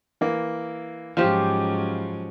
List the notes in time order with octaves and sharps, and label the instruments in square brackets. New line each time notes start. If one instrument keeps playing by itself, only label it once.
[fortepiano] E3 A#3
[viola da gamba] G#2 F#3 C#4 [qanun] F3 G4 [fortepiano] F4 C5 F5